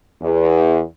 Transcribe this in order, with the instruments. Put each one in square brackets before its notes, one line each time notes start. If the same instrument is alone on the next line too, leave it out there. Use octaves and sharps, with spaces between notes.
[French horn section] E2